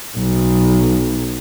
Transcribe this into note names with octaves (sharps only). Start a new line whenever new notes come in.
B1